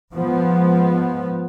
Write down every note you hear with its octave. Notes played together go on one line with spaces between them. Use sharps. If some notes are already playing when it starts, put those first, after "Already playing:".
G#2 F3 B3